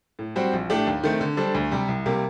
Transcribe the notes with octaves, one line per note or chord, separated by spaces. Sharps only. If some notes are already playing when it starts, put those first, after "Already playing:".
A2
G3 C4 F#4 C5
A#1
A2 A3 D4 G4
D#2
D#3 A3 C4
D3
G3 D4 A4 C5
D2
C3 G3
C2
C3 G3 A#3